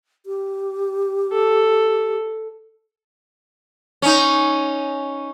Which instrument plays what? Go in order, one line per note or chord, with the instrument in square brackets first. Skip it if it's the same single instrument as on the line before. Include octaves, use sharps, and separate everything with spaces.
[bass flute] G4
[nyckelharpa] A4
[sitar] C#4 D#4